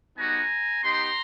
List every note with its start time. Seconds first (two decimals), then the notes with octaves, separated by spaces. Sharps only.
0.15 G3 B3 D#4 F#4 G#5 A#5
0.83 B3 D#4 G4 A#5 C6